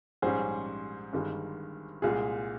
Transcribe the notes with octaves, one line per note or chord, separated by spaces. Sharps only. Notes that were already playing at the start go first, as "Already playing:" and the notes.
A#1 G#2 G3 C#4 G#4 C5
G1 G2 D#3 G#3
C2 A#2 G#3 F4 G#4